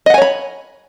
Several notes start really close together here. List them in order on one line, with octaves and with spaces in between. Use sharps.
D#5 F#5 G#5 C#5 B5